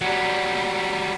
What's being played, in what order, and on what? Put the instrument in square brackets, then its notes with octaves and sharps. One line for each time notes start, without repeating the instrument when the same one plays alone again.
[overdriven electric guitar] F#3 G3